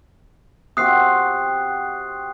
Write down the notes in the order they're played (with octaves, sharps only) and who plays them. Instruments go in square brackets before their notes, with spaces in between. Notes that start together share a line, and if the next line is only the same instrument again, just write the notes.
[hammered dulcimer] C3 C4 F#4 [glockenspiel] D#6 F#6 C7